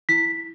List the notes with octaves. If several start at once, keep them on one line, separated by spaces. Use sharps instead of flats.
E4 B6